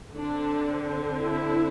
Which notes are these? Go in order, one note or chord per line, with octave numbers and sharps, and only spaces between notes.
D3 C4 D4
E4